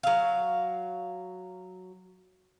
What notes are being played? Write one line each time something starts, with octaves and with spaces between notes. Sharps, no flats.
F#3 F5